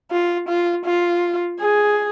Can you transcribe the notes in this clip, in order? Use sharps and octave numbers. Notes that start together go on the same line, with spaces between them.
F4
F4
F4
G#4